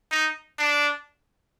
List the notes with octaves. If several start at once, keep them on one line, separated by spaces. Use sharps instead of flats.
D#4
D4